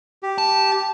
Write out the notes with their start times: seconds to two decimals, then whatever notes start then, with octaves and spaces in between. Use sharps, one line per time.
0.23 G4
0.38 A5